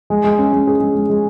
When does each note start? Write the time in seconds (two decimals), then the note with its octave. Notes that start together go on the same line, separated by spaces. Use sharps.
0.10 G#3
0.24 G#3
0.39 C#4
0.53 G#3
0.67 G#4
0.80 G#3
0.95 G#3
1.10 G#3